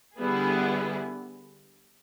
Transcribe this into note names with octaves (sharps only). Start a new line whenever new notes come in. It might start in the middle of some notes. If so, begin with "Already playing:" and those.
D3 G3 B3 E4 G#4